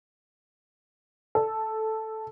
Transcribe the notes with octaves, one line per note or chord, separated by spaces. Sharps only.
A4